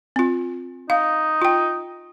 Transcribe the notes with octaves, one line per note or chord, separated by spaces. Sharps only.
C4 F4
D#4 F5
F4 G5